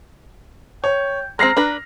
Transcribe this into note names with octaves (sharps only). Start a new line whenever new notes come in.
C#5 G5
G#3 C4 A#5 F6 A#6 C7
D4 B4